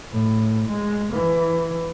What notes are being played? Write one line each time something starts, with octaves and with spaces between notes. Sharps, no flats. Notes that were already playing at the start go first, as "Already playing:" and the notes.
A2
G#3
E3